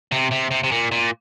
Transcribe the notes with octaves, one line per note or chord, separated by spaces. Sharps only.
C3
C3
C3
C3
A#2
A#2